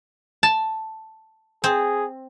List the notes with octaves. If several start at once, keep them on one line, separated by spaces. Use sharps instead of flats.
A5
C4 G#4